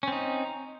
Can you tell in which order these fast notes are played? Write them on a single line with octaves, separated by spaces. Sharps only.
C#4 C4 D#4